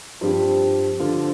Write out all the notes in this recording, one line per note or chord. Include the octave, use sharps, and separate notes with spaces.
G2 F3 C4 G4
D3 F3 D4 F4